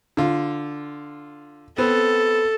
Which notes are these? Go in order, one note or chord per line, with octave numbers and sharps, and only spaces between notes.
D3 F4
B3 C4 A4